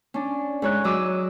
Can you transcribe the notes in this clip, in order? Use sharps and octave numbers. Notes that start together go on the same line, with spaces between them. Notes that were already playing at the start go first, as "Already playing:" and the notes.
C#4 D4
G#2 C#5 F#6
F#3 D#5 D6 E6